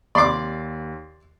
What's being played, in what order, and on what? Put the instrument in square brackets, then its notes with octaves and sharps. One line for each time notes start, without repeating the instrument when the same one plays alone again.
[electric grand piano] D#2 C7 [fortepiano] D5 C6 D6